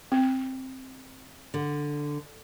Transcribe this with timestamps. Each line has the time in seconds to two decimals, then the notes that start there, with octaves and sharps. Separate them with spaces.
0.12 C4
1.54 D3